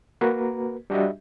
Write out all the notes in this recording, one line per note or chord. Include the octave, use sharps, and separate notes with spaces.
A#3 F#4 A#4 B4
G3 D4 F#4 G4 D#5 E5